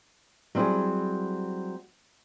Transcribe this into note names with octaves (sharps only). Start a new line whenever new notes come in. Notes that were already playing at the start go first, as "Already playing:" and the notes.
F#3 G3 C4 E4 G#4